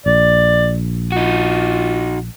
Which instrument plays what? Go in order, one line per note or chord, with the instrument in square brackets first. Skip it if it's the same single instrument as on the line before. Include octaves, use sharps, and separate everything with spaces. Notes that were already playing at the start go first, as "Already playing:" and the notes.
[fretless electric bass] A#1 [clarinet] D5
[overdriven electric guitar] D#4 F#4 [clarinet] F4